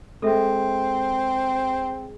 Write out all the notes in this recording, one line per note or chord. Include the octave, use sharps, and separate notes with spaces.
G#3 C4 A4 E5